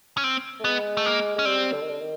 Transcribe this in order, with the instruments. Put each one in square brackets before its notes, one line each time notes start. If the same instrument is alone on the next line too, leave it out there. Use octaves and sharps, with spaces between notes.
[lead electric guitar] C#4
C4
[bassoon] A3
[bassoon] G#3 [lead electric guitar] B3
[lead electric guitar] A3
A#3
[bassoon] G#3 [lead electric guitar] C#4
[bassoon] G3 [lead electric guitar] C4
[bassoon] D3
D#3
D3
D#3